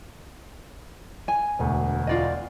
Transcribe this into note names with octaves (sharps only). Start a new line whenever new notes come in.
G#5
E1 D2
F4 D5 D#5